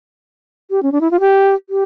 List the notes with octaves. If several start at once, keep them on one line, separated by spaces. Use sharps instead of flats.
G4
C#4
D4
E4
F4
G4
G4